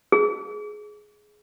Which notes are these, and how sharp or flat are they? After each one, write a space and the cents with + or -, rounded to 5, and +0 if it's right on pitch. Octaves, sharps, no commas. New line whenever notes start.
G#4 +15